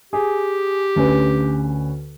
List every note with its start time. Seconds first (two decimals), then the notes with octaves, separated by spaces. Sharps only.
0.13 G4 G#4
0.96 D2 C#4 B4